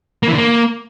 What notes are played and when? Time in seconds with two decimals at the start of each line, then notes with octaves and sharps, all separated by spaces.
0.23 A#3
0.28 E3
0.33 D3
0.38 A#3